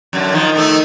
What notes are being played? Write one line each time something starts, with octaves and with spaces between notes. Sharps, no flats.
F#2 D3
D#3 F3
D#3 A3 D#4